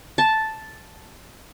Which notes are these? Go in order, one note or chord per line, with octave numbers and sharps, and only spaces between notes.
A5